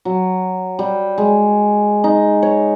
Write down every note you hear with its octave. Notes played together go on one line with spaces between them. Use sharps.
F#3
G3
G#3
D#4
C#5